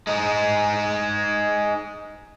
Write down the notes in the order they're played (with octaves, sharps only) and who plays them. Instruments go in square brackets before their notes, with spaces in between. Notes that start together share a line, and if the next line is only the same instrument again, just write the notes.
[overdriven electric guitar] G#3 D#4